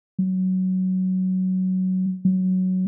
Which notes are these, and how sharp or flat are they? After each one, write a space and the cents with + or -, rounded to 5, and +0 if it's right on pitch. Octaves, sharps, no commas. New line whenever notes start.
F#3 +10
F#3 +5